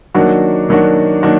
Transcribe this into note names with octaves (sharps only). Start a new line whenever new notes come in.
D#3 F#3 A#3 D4 F#4
D#3 F#3 A#3 D4 F#4
D#3 F#3 A#3 D4 F#4